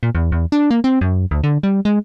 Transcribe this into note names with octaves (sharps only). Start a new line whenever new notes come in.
A#2
E2
E2
D4
A#3
C4
F#2
D2
D3
G3
G#3